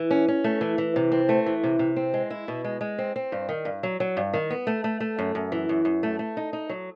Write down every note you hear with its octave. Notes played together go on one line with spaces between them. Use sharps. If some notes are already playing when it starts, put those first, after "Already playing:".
Already playing: E3
C#4
C#4
A3
E3
E3
C3
C4
A3
E3
C3
C3
C4
G#3
E4
B2
G#3
G#3
C4
C4
G2
D#3
G2
F#3
F#3
G2
D#3
B3
A3
A3
A3
F#2
F#2
E3
F#2
F#2
A3
A3
D#4
D#4
F#3